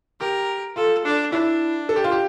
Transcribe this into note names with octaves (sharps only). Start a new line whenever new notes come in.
G4 A#4
F4 A4
D4
D4 E4
A4
G4
F4
G4